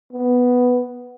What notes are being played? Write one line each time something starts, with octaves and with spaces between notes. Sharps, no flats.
B3